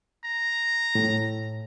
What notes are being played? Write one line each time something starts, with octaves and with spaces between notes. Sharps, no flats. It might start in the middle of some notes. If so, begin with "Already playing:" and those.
A#5
A2